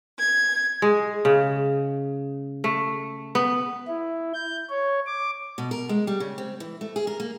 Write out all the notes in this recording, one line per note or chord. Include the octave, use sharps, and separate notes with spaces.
G#6
G#3
C#3
A3
B3
E4
G6
C#5
D6
B2
A#4
G#3
G3
C#3
C4
E3
A3
G#4
A#4
A#3